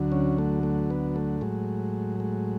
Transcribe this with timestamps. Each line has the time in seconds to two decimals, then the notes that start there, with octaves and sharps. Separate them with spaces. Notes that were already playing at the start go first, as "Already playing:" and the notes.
Already playing: D2 D3 F#3
0.12 C#4
0.38 A3
0.63 A3
0.90 B3
1.16 A3
1.41 A2 F#3 G#3
2.20 G#3